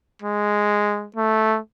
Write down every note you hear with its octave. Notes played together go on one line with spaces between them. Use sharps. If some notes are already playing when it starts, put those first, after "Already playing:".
G#3
A3